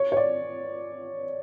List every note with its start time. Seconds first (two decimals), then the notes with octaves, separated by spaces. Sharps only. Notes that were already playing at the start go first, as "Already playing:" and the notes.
Already playing: C#5
0.12 C#5
0.17 D5